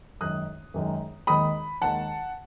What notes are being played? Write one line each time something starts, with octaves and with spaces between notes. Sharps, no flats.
F#2 D#3 G#3 D#6 F#6
F#2 D#3 G#3
D#2 D#3 G#3 B5 D#6
D#2 D#3 G#3 F#5 A5